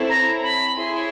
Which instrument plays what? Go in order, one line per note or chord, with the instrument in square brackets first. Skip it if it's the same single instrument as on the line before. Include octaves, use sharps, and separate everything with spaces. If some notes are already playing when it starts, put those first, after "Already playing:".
Already playing: [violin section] C4 E4 A4 C#5
[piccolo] A#5
B5
[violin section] E4 G#4 C#5 [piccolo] C6